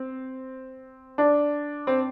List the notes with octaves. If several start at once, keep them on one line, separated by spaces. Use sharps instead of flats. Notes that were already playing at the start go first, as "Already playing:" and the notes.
Already playing: C4
D4
C4